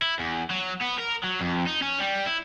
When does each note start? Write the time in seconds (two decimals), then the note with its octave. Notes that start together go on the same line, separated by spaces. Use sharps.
0.02 E4
0.19 E2
0.50 F#3
0.81 B3
0.98 A#4
1.24 F#3
1.41 F2
1.67 D#4
1.82 C#4
2.00 G3
2.27 E4